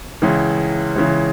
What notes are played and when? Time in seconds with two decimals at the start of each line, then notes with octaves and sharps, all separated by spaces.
0.22 C#2 C#3 E3
0.96 C#2 C#3 E3